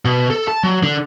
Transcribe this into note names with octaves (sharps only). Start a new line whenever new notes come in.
B2
A4
A5
F#3
D3